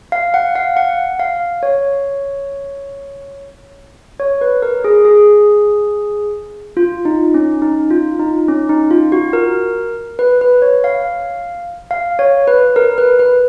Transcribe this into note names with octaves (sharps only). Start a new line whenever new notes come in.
F5
F#5
F5
F#5
F5
C#5
C#5
B4
A#4
G#4
G#4
F4
D#4
C#4
D#4
F4
D#4
C#4
D#4
F4
F#4
A#4
B4
B4
C#5
F5
F5
C#5
B4
A#4
B4
B4